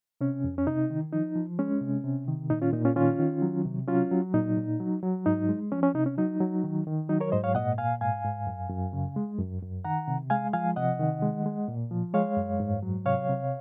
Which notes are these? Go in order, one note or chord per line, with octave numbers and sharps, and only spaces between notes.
C3 C#4
F2
C#4
C3 D#4
D#3
F3 D#4
F3
G#3 C#4
C3
C3
D#3
A#2 D#4
C#4 F4
A#2 D#4
C#4 F4
D#3 C#4 F4
D#3
F#3
C3
F#3 C#4 F4
F#3
A#2 D#4
A#2
F#3
F#3
G#2 D#4
G#3
F3 C#4
C#4
C3 D#4
C#4
F#3 D#4
F#3
D#3
D#3
F#3 D#4
A#4 C#5
G#2 C5 D#5
C#5 F5
A#2 D#5 F#5
A#2 F5 G#5
G#2 F5 G#5
G#2
F#2
F#2
C#3
G#3
F#2
F#2
D#3 F#5 A#5
C3
G#3 F5 G#5
F3 F5 G#5
C3 D#5 F#5
D#3
G#3
G#3
A#2
F3
G#3 C#5 F5
F#2
G#2
F#3
C3 C#5 F5
C3